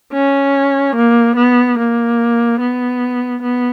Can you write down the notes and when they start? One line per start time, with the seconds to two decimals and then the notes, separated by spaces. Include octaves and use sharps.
0.14 C#4
0.96 A#3
1.37 B3
1.78 A#3
2.60 B3
3.43 B3